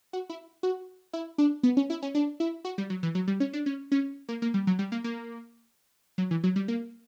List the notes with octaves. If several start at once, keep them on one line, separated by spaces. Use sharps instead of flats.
F#4
E4
F#4
E4
D4
B3
C#4
E4
C#4
D4
E4
F#4
G3
F#3
E3
F#3
G3
C#4
D4
C#4
C#4
A#3
A#3
G3
F#3
G3
A#3
A#3
F#3
E3
F#3
G3
A#3